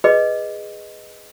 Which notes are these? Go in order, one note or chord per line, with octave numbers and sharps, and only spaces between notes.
G#4 B4 D#5